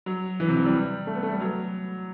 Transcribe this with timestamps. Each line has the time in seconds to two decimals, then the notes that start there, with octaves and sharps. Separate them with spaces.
0.06 F#3
0.40 E3
0.48 C3
0.57 E3
0.65 G3
1.07 A3
1.15 B3
1.23 A3
1.32 G3
1.40 F#3